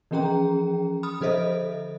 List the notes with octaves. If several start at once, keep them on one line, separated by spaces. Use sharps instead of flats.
E3 F3 C#4 G#4 G5 A#5
B5 D#6 F6
D3 F3 A4 C5 D#5 E5